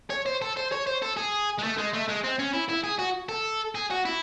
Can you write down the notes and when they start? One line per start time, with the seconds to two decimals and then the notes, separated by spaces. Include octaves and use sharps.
0.10 C#5
0.26 C5
0.42 A4
0.57 C5
0.72 C#5
0.87 C5
1.02 A4
1.16 G#4
1.58 G#3
1.63 A3
1.77 G#3
1.93 A3
2.08 G#3
2.24 C4
2.39 C#4
2.53 E4
2.69 E4
2.84 G#4
2.99 F#4
3.29 A4
3.75 G#4
3.91 F#4
4.05 E4